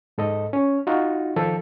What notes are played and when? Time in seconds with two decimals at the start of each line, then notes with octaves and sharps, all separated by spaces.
0.18 G#2 A4 D#5
0.53 C#4
0.87 D#4 F4 F#4
1.36 D#3 F3 A4